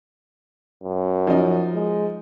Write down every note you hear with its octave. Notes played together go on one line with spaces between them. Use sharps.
F#2
F3 D#4
G#3